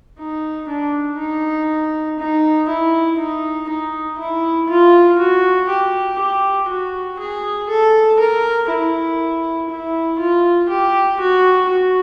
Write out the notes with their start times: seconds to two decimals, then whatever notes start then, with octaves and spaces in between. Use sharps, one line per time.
0.19 D#4
0.69 D4
1.18 D#4
2.19 D#4
2.69 E4
3.19 D#4
3.69 D#4
4.19 E4
4.69 F4
5.19 F#4
5.70 G4
6.19 G4
6.69 F#4
7.20 G#4
7.69 A4
8.20 A#4
8.70 E4
9.70 E4
10.19 F4
10.69 G4
11.20 F#4
11.69 F#4